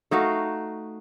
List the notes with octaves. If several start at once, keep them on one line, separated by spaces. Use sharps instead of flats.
A3 D#4 F#4 F5